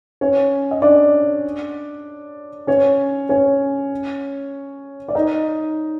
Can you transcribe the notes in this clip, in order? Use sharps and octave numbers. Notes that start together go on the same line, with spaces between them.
C#4 C#5
D#5
D4 D5
C#4 C#5
C#4 C#5
D5
D#4 D#5